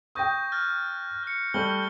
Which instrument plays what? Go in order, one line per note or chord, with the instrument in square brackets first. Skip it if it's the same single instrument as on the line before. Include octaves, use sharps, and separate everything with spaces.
[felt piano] G5 D#6 [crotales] C#6 G6 A#6
[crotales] F6 F#6 A6
F6 C#7
[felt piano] G3 A3 G6 [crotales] C#6 F#7 G7